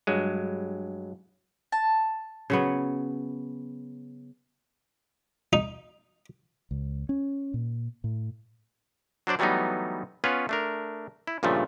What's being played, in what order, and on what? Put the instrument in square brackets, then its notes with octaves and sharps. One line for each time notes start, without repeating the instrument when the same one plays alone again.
[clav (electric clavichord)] G2 F#3 G#3
[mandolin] A5
[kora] C#3 F#3 B3
[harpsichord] D#4
[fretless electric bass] C#2
C#4
A#2
A2
[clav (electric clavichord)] F#3 D4 C5 D5
E3 F#3 G3 A3 B3 D#4
B3 C#4 F4 B4 C#5
A3 D4 A#4
E4
G2 A#2 C#3 F3 A3